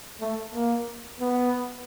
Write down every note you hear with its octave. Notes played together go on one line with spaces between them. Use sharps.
A3
A#3
B3